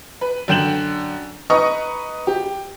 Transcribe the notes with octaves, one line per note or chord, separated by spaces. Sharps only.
B4
F#2 D3 G5 G6 E7 F#7
D#4 B4 D#5 A#5 C#6 D#6
G4